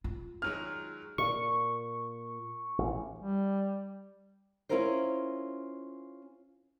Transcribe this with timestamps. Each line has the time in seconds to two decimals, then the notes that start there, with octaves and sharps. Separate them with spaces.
0.04 F4
0.42 D#3 F#3 G#3 F6
1.18 A#2 C#6
2.79 A1
3.19 G3
4.69 C#4 D4 E4 F4 A#4 C5